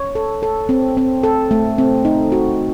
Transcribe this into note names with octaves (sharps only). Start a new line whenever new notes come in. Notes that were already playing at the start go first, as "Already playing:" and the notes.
Already playing: C#5
A4
A4
C4
C4
A4
A3
C4
D#4
F#4